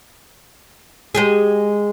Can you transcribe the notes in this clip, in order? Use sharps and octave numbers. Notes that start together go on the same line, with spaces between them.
G#3 G4 G#4